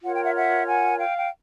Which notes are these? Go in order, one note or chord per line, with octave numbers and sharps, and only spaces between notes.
F4 A#4 C#5 F#5
G5
E5 F#5
E5 F#5
F#5 G#5
F5 G5
G5